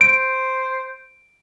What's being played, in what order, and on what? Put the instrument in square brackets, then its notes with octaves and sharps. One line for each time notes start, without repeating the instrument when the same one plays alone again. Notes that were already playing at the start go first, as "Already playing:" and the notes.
[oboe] C5 [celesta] D7